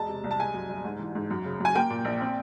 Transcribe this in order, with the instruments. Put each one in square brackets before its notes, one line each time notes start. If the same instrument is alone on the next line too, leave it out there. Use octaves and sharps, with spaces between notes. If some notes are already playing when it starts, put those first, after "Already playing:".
Already playing: [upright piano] E1 G#3 A5
C3
C2
A5
G#3 G#5
F#2
G1
G#2
E3
G#2
F#2
C#3
F#2 G#5
A#3 G5
A#2
A#1
C4